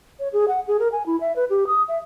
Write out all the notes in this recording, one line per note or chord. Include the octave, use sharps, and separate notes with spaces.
C#5
G#4
F#5
G#4
A#4
G#5
E4
E5
B4
G4
D#6
E5